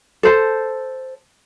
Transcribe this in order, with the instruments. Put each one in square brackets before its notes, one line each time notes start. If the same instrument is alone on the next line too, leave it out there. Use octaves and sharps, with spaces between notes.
[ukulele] A4 C5 A5